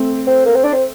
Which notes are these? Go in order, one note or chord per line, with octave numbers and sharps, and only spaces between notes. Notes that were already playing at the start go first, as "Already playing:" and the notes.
Already playing: A3 C4
C4
A#3
C4
D4
C4